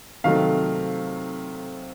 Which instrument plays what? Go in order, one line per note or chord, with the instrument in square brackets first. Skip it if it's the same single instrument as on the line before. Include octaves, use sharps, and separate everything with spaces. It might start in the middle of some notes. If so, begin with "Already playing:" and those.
[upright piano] C3 D#3 F#3 A3 C4 F5